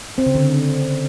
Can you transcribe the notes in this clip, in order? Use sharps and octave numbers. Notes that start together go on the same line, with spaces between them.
C4
C#3
D3